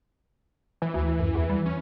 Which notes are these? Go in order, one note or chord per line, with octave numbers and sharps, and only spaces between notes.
E3
D2
F#2
E2
G3
C#4